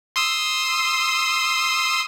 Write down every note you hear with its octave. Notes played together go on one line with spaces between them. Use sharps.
C6 D#6 E6